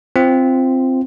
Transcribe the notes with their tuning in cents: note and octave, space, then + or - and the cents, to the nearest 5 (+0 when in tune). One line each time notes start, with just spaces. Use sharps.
C4 +0 F4 -15